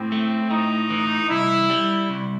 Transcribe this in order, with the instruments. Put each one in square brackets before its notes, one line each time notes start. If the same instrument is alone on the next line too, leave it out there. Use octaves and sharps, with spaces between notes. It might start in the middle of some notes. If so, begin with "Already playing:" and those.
Already playing: [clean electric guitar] A2 [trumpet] C4
[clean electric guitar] A3
[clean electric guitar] A2 [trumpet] D#4
[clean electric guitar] E3
[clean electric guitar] C2 [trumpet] E4
[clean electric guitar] G3
C2